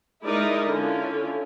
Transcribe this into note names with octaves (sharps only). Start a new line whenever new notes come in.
G#3 D#4 E4 A#4 D5 D#5
D3 C#4 E4 F4